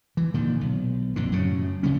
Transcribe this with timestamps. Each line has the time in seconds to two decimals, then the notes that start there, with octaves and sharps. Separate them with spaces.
0.17 E3
0.34 A#2 D3 D#3
0.61 B1
1.16 A#1 F2 A#2 D3
1.32 F#2 A2 C#3
1.83 F1 C#3 G3 C#4